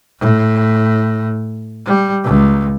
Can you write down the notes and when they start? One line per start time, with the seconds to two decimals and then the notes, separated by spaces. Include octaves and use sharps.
0.20 A2
1.85 G3
2.24 C#2